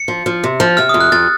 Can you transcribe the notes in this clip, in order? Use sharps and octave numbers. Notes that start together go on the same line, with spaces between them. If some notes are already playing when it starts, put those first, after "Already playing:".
Already playing: C#7
F3
F3
C3
F3
C3 F6
F2 D#6
F#6
F2 A6